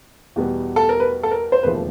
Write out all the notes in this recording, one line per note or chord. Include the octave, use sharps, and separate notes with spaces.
E2 B2 G3 B3
A4
A#4
B4
A4
A#4
C5
E1 D#2 C#3 F3 A3 B4